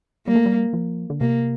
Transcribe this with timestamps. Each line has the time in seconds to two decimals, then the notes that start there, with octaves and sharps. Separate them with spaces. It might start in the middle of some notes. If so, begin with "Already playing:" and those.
0.27 G3 A#3
0.36 A3
0.46 G3
0.73 F3
1.10 D3
1.21 C3 A#3